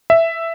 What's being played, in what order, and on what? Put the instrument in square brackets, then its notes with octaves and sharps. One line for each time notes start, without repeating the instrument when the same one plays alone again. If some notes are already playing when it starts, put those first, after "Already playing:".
[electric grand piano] E5